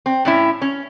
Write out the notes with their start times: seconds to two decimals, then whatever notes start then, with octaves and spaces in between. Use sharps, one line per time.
0.06 C4
0.25 A2 C#4 E4
0.62 C#4